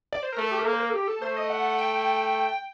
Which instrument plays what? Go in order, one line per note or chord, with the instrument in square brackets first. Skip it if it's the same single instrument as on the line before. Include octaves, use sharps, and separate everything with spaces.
[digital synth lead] D5
C5
A#4
[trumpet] A3 [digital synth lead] A4
[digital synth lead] G4
A#4
[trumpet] A#3 [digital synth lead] A4
[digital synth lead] C5
A#4
A4
G4
A4
[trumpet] A3 [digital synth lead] C5
[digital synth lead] D#5
F#5
G5